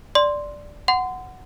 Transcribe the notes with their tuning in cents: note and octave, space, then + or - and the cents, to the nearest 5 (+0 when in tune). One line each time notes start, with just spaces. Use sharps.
D5 +0 C6 +0
F#5 +0 C6 -30